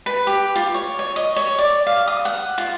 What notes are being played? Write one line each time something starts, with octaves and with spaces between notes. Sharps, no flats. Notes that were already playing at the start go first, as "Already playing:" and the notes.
B4
G4
F4
C#5
C#5
D#5
C#5
D5
F5
D#6
F#5
F4